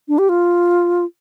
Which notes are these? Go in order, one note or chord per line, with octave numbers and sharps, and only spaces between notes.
D4
G4
F4